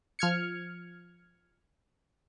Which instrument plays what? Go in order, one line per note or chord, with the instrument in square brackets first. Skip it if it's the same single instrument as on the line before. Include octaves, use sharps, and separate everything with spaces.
[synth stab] F3 F6 G#6 C#7